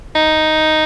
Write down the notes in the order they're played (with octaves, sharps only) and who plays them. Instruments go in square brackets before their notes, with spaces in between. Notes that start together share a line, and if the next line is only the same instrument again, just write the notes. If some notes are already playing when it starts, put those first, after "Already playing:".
[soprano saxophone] D#4